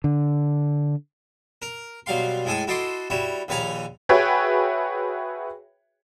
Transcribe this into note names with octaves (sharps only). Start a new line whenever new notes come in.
D3
A#4
B2 F#3 G3 F5 C6
A2 G#3 G#4 A4 G#5
E4 F#4 A4 D#5 C6 D6
G3 E4 F#4 C#5
A#1 D#2 B4 C#5 G#5 A#5
F#4 G#4 B4 C#5 E5 G5